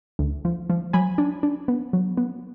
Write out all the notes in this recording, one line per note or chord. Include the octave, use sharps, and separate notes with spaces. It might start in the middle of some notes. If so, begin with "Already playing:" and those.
D2
F3
F3
F#3 G#5 B5
D4
D4
B3
F#3
B3